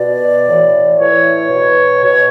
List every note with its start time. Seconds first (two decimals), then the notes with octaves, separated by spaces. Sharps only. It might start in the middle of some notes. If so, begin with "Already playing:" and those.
Already playing: B2 D5
0.45 A2 E3
0.98 A2 E3 C#5
1.50 B2
2.03 B2 C#5